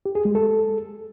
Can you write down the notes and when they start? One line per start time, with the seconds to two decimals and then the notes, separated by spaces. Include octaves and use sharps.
0.06 G4
0.15 G#4
0.25 G#3
0.35 A4